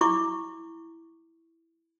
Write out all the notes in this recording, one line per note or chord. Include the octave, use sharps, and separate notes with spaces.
E4 C#6 D6